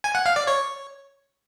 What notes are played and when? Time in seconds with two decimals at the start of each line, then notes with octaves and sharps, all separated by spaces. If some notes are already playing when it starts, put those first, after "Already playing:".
0.04 G#5
0.15 F#5
0.26 F5
0.36 D5
0.47 C#5